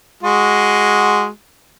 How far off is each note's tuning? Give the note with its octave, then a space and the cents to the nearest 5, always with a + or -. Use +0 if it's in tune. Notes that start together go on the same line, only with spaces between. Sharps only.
G#3 +0 F#4 +0